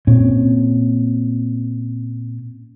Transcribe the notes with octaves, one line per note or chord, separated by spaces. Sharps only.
A#2 C4 C#4